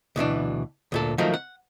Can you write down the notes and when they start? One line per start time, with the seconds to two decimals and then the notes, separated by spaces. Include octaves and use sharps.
0.16 D2 B2 E3 D4
0.92 D2 A#2 A4
1.18 D#3 F3 F#3 A3 A#3
1.34 F#5